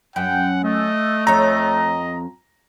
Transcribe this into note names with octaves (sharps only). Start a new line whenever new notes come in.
F#2 F#5 G5
A3 D#5
F2 C#5 D#5 A#5